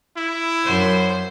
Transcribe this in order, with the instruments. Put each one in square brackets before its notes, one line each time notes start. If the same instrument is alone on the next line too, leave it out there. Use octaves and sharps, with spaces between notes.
[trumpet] E4
[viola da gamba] F#2 C5